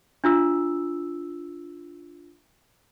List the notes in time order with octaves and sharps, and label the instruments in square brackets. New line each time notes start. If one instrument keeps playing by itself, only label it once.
[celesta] D4 F4 E6